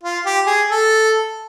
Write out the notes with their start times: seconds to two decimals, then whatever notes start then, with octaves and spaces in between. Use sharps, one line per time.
0.03 F4
0.25 G4
0.47 G#4
0.69 A4